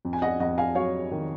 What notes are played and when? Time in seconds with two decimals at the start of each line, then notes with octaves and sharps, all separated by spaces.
0.05 F2
0.13 G#5
0.22 D#5 F#5
0.40 F2 D#5 F#5
0.58 F5 G#5
0.75 F#3 C#5 F5
1.12 D#3